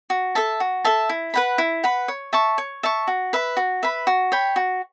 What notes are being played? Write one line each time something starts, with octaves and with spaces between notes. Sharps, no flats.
F#4
A4 E5 A5
F#4
A4 E5 A5
E4
B4 F#5 B5
E4
B4 F#5 B5
C#5
E5 A5 C#6
C#5
E5 A5 C#6
F#4
B4 E5 B5
F#4
B4 E5 B5
F#4
C#5 G5 B5
F#4